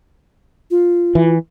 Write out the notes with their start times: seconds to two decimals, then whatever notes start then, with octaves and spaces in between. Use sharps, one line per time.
0.71 F4
1.15 E3